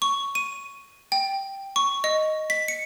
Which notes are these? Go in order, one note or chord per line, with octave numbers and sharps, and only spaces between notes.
C#6
D#7
G5
C#6
D#5
B6
C#7